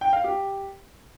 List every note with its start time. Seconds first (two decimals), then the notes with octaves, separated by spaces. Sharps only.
0.01 G5
0.13 F5
0.24 G4